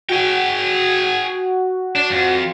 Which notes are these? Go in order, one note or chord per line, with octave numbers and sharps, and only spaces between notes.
F#4 G#4 G5
D4
F2